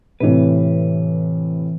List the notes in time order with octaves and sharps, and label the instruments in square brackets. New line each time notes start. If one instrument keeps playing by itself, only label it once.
[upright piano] A2 C3 [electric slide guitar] E3 B4